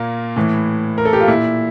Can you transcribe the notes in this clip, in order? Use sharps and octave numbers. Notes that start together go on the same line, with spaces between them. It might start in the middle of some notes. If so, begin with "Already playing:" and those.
Already playing: A#2 A#3
A2 E3
A#4
A4
G4
F4
A#2 E4